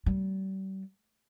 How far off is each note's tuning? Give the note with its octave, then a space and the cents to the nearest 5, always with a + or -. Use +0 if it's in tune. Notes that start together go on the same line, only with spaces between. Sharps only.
G3 -40